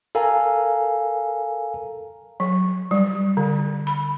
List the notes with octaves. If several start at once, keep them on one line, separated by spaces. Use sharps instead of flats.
A4 A#4 F5 G#5 A#5
F#3
G3
D3
B5